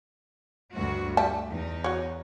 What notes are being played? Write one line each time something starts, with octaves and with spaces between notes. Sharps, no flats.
D2 G2 F#4
G3 A3 E5 A5
E2 D#4
F#4 C#5